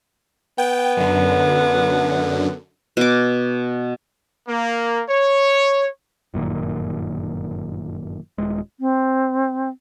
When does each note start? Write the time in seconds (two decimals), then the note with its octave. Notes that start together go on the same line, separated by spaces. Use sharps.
0.58 B3 G5
0.97 F#2 D3
2.97 B2 D6
4.49 A#3
5.09 C#5
6.34 G1 F#2 A#2 D#3
8.38 D#1 G#3
8.80 C4